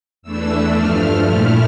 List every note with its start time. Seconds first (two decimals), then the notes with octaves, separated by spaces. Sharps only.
0.22 E2 E3 A3 D4 E6
0.74 G2 F3 A3 F6
1.26 A#2 A3 E4